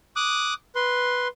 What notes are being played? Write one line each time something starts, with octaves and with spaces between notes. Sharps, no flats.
D6 D#6 F#6
B4 C6